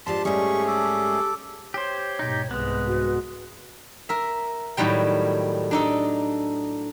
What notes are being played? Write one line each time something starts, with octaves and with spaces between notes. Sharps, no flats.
G#2 F3 D4 G4 A5 C6
G#2 G3 A3 C#4 G#4 C#6
A4 D6
G4 C5 C#5
G#2 B2 D#4 G4
C2 G#2 G#3 B3 B4
F#4
A#4 E5
A2 D#3 F#3 G3 G5
D4 D#4 A4